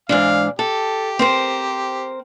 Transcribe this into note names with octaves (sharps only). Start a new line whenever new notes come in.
G#2 E3 D4 F5
G4 A4
C4 A#4 C5